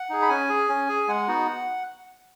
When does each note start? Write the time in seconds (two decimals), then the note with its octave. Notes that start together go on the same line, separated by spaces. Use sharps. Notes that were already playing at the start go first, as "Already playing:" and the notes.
Already playing: F#5
0.10 D#4 G#4
0.22 B5
0.29 C#4 G#5
0.49 G#4
0.69 C#4
0.89 G#4
1.08 G#3 F#5
1.28 B3 D#4 F#4